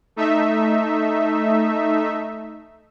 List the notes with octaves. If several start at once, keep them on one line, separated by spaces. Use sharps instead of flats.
A3 D#4 E5